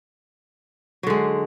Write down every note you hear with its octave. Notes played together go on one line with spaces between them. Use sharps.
D3 F#3 G#3